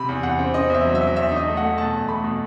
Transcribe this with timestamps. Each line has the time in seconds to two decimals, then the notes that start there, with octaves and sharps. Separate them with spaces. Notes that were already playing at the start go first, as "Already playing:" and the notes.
Already playing: C3 B5
0.09 E2
0.23 E2 F#5
0.39 C4
0.54 C4 D#5
0.70 E2 E5
0.85 F#3
0.95 E5
1.01 F#3
1.16 E2 E5
1.32 D#4 D#5
1.47 A3
1.57 F#5
1.63 A3
1.78 B2 A5
1.93 E2
2.08 A3 B5
2.24 B2